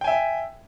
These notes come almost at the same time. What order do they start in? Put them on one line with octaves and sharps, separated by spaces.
G5 G#5 E5